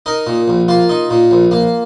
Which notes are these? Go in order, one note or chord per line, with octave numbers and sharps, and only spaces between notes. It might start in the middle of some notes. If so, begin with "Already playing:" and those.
D#4 A#4
A#2
A#1
A#3 F4
D#4
A#2
A#1
A#3